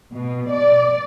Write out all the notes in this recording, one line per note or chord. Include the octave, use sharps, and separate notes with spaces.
B2
D5